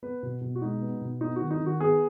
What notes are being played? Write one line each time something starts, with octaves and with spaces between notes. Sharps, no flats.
B3 B4
B2
B2
F#4
G#3 D#4
B3
B2
B3 D#4
D#3 F#4
D#4
D#3
F#4
B3 G#4